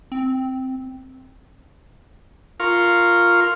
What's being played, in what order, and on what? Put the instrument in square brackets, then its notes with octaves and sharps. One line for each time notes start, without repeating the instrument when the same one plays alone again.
[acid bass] C4
[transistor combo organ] F4 A#4 F5 C6 C#6